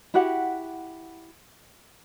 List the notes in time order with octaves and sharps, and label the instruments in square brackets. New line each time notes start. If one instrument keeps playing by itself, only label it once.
[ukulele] E4 F#4 G4 F#5